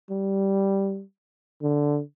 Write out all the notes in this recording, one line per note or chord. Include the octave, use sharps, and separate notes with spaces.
G3
D3